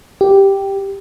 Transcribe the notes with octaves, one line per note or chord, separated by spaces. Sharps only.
G4